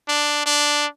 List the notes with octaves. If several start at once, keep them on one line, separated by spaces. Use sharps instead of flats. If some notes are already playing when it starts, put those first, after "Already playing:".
D4
D4